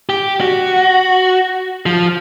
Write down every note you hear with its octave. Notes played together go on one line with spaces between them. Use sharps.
G4
F#4
F3